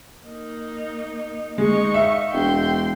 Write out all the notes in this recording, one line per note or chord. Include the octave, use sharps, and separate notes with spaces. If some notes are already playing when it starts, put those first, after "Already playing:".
A#3 D#4
G#3 D#4 C#6
E5 F5
E1 G5 C6